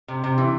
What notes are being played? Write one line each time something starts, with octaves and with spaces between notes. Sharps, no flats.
C3
C3
E3